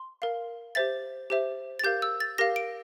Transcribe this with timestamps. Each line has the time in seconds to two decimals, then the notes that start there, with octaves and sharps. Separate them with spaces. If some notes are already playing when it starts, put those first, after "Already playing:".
Already playing: C6
0.22 A#4 F5
0.75 G4 C5 E5 A6
1.30 G4 C5 E5
1.79 A6
1.84 G4 A#4 F5 G6
2.02 E6
2.20 A6
2.38 G4 A#4 F5 A#6
2.56 D7